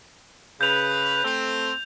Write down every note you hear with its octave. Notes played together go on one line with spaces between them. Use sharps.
C#3 B4 G6 F7
A3 C4